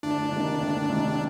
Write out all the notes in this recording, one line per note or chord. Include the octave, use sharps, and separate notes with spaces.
D2 D4
C3 D#3 A#3
D2
C3 D#3 A#3